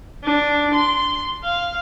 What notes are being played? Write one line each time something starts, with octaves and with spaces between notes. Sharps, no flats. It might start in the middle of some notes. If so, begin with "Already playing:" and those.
D4
C6
F5